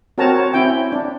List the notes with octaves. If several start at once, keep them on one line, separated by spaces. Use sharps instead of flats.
C4 F#4 A#4 C#5 A5 A#5
C#5
C4 C#4 E4 G5
D4